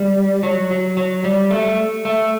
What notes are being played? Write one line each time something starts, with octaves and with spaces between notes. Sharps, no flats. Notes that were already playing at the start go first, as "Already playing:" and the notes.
Already playing: G3
F#3
F#3
F#3
G3
A3
A3